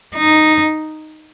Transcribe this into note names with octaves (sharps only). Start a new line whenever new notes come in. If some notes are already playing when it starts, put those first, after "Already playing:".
D#4